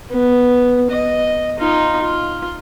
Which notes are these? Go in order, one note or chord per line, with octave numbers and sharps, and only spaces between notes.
B3
D#5
D#4 F4
F4